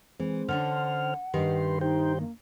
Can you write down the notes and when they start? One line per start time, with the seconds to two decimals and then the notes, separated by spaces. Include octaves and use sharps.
0.20 E3 G#3 C4
0.49 D3 C#4 D4 C5 F#5 F6
1.34 G2 D#3 G4 B4 C6
1.81 D#4 G4 C5 G5
2.20 A#3